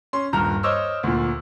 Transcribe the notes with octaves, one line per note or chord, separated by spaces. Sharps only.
C#4 C6
D#1 G2 A#5 F6
C5 C#5 D#5 D6 E6 F6
D2 A#2